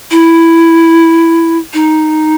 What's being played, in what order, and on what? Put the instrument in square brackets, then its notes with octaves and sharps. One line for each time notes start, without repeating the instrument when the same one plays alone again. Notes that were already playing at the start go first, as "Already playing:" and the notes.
[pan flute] E4
D#4